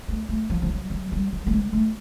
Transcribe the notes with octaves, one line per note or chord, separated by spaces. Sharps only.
A3
A3
F3
F3
F#3
F#3
G3
F#3
A3
G#3
A3